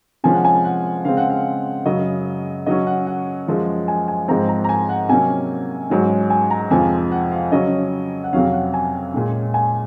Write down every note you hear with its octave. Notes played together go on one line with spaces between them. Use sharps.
C3 F3 G#3 C#4 G#5
F#5
G#5
F#5
C#3 G#3 C4 F5
F#5
F5
F#2 C#3 F#3 D#5
C#3 F#3 C#4 D#5
F#5
F#5
F#2 F3 G#3
G#5
G#5
G#2 F3 C4 A#5
A#5
A#5
G#5
F#5
C3 F#3 A#3 C#4 G#5
G#2 F#3 C#4
G#5
A#5
F2 C3 F3 G#3 G#5
F#5
F5
C#3 F#3 C#4 D#5
F#5
F2 C3 F#3 C#4 F5
F#5
G#5
A#2 G#3 C#4
G#5